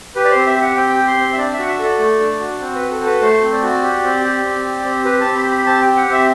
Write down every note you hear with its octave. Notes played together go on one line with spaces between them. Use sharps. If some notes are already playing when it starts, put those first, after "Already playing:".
G4 B4
D5
C4 C5
E5
G4 F#5
C4 G5
G4
C6
C4
E5
D4 D5
E5
F#4 F#5
E5
A4
D5
A3
D4
F#4
C4
B4
F#4
A4
A4
B4
A3 C5
C4
D5
F#4
G4
C4
G4
C4
G4
C4
G4 B4
A5
C4
B5
G4
B5
C4 A5
G4 G5
F#5
C4 E5